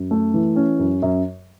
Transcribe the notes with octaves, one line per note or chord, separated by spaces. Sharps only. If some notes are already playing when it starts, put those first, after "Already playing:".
Already playing: F#2
A3
E3
C#4
F#2
F#2